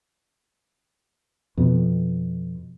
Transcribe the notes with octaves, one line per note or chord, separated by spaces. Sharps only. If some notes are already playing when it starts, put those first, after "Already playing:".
F2 B2